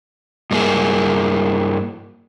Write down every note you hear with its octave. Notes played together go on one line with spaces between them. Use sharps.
G2 A#3 G#4